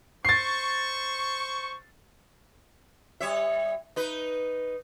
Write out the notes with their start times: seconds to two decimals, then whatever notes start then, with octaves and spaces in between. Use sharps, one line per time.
0.25 C5 C#6 A6 C7
3.21 G3 C#5 E5
3.96 D#4 B4